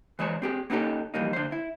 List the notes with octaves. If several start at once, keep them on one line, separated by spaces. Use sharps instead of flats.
E3 G#3 C5 C#5
C4 G4 G#4
A#3 B3 C#4 D#4 G4 A4
E3 F3 G3 A#3 D#4
D3 C5
E4